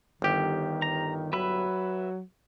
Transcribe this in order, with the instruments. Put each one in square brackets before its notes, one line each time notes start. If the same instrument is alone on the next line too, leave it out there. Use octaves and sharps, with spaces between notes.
[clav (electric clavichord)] G1 G4 [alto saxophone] D#3
[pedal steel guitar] A#5
[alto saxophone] F#3 [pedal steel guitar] B4 E5 B5